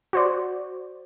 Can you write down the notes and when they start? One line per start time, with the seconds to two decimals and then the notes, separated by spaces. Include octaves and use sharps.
0.13 F#4 C5 D5